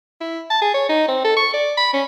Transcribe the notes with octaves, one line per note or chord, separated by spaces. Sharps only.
E4
A5
G#4
C#5
D#4
C4
A4
C#6
D5
B5
C#4